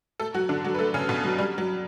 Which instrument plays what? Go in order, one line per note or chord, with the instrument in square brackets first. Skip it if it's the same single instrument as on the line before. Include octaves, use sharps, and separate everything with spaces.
[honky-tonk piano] A3 A4
F#3 F#4
D3 D4
F#3 F#4
B4
A3 A4
C#3 C#4
B2 B3
F#3
G3
F#3